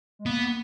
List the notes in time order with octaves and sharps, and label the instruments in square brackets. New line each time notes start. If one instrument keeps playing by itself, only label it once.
[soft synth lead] G#3
[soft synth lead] A#3 [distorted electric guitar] B3